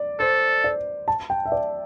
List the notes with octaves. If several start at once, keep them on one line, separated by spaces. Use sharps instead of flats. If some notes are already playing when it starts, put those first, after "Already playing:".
Already playing: D5
A4 C5
D5
A5
G5
E5
D5